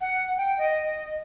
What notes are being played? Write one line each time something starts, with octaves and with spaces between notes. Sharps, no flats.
F#5
G5
D#5